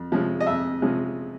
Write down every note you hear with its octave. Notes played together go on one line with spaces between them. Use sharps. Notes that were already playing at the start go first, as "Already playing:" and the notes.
Already playing: F2
C3 F3 G#3 C#4
D#5
F2 E5
C3 F3 G#3 C#4